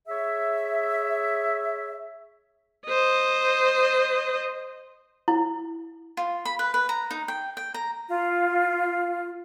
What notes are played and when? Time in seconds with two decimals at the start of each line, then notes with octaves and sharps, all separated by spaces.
0.08 G#4 C#5 E5
2.87 C5 D#5
5.28 E4
6.17 F4
6.45 B5
6.59 B4
6.74 B4
6.89 A#5
7.11 D#4
7.28 G5
7.57 G5
7.74 A#5
8.09 F4